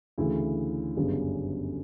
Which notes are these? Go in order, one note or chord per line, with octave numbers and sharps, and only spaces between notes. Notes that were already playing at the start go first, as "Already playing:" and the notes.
D2 C#3 E3 A3 E4
G1 F#2 C#3 G3 B3